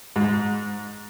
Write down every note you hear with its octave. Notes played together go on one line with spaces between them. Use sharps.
G#2